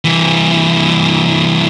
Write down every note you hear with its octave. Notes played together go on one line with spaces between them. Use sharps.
C2 E3